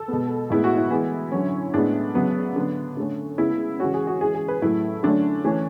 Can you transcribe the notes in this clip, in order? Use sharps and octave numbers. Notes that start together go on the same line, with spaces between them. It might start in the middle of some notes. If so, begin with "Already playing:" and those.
Already playing: A4
B2 G#3 B3
A2 G#3 B3 E4
F#4
E4
E3 G#3 B3
D3 F#3 C#4
A2 G#3 B3 D4
C#3 F#3 B3
D3 F#3 B3
D3 A3 C#4
C#3 G#3 B3 E4
C#3 E3 G#3 C#4 F#4
G#4
F#4
E3 G#3 C#4 G#4
G#4
B4
A2 F#3 A3 E4
D3 F#3 A3 C#4 D4
E3 A3 C#4